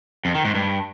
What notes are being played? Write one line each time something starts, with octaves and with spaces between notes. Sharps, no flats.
F2
D#3
G#2
G2